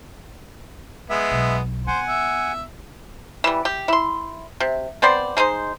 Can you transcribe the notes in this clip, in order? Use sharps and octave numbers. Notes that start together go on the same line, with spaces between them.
G#3 B3 E5
B1
B3 C5 F#5 G#5
E5
E3 G3
G4
E4 C6
C3
B3 C4 C5 D5
G#3 D#4 G#4 C5